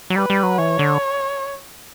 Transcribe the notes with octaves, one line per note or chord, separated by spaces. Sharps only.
F#3
G3 B4
G3
F#3
E3 C#5
D3